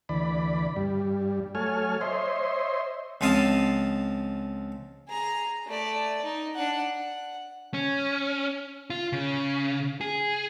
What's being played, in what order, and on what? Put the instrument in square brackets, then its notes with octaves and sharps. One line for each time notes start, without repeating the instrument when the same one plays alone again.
[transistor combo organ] D2 E3 D5 B5
G2 G3
F#3 A3 A4 C#5 G#5 F6
C5 C#5 D#5 E5 C6
[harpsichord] C#2 F3 C4 D#5 F5 A5
[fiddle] G#4 A#5
A3 D5
D#4
D4 F#5
F#5
[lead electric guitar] C#4
F4
C#3
G#4